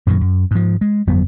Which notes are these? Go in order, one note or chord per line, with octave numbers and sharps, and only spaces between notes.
F#2 A#2 D3 D#3
F#2
G#2 F3
G#3
G1 F2 F#3 B3